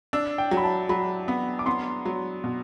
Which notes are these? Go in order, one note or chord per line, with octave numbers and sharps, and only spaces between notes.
D4 E6
G5
F#3
B5
A5
F#3 B5
B3
D6
B3 C6
F#3
B2